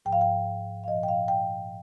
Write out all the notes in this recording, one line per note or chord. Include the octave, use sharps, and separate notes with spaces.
G#2 F3 G5
F5
G5
F5
A#2 F3 D#5
G5
F5
G5